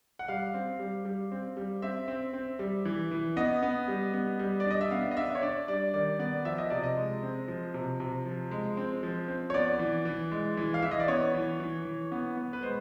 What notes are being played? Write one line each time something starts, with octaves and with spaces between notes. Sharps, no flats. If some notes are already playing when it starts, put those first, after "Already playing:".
F#5
G3 F5
C4
G3
G3
C4
G3
C4 E5
C4
C4
G3
E3
E3
B3 D#5
B3
G3
B3
G3
D5
D4 D#5
E5
B3 F5
D#5
D4 E5
C#5
D4 D5
G3 D5
D#3 D5
B3 D5
F3 E5
D#5
C3 D5
D#5
G#3
C4
F3
C3
C3
F3
G#3
C4
F3
C4
C#5
B3 D5
E3
E3
G#3
E3
F5
E3 E5
D#5
D5
B3 C#5
E3
E3
E3
B3
B3
B4
G#3 C5